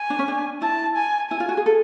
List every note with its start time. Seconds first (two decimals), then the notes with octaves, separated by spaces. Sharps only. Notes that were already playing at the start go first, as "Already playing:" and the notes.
Already playing: G#5
0.10 D4
0.19 C#4
0.28 D4
0.62 E4 A5
0.97 G#5
1.31 E4 G#5
1.40 F4
1.49 F#4
1.57 G#4
1.66 A4